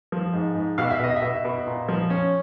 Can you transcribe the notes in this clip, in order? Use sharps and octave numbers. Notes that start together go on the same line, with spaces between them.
F3
G#2
G#2
B2 F5
E5
B2 D#5
E5
B2
B2
A#2
F3
C#4